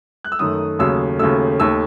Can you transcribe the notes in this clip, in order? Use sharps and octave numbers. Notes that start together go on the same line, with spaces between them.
F#6
E6
F#2 D#3 A3 D#6
D#2 C#3 F#3 A3 E6
D#2 C#3 F#3 A3 E6
D#2 D#3 A3 E6